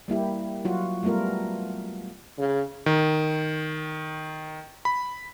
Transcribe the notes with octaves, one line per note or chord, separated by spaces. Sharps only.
G3 A#3 E4 G4
F#3 F4 F#4
G3 A3 B3 F4 A#4
C#3
D#3
B5